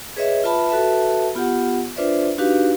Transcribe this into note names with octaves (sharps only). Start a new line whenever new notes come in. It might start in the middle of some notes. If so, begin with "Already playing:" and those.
G#4 B4 C#5 D#5 E5
F4 B4 E5 A5 B5
F#4 A4 B4 E5 A5
B3 F4 G4 F#5
D4 F4 B4 C5 D5 E5
D4 D#4 F#4 G4 B4 F5